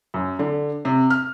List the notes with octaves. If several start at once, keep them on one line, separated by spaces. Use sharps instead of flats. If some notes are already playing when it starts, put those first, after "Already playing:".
F#2
D3
C3
F6